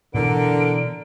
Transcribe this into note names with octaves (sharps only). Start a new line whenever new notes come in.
B2 D3 E3 A#4 D7